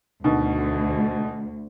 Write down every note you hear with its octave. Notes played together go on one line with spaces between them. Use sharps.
D2 B2 D3 D#3